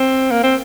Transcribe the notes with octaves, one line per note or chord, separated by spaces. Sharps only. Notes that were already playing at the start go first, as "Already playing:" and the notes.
Already playing: C4
A#3
C4